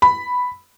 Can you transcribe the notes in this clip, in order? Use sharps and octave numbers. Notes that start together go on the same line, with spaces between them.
B5